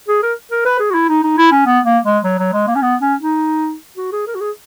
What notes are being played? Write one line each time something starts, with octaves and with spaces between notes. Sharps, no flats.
G#4
A#4
A#4
B4
G#4
F#4
E4
D#4
D#4
E4
C#4
B3
A#3
G#3
F#3
F#3
G#3
A#3
C#4
B3
C#4
D#4
F#4
G#4
A#4
F#4
G#4